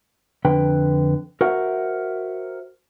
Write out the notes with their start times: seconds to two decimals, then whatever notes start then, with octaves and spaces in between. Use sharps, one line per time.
0.45 F2 D3 B4 G5
1.41 F#4 A#4 C5 E5 F#5